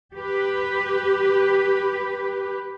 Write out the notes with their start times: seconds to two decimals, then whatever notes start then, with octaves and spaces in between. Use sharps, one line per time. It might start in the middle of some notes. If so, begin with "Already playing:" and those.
0.14 G4 B4